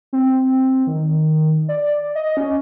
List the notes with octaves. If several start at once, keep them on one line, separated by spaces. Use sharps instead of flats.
C4
D#3
D5
D#5
C#4